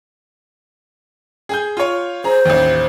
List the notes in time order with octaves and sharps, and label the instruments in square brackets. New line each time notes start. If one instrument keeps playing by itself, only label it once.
[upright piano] G#4 G#5 G6
F4 C#5
[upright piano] G#4 A#5 [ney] C5
[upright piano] A1 D#2